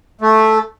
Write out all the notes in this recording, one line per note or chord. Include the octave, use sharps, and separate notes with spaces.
A3